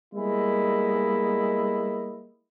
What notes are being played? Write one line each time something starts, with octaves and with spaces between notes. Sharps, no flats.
G3 G#3 A#3 B3 E4 D#5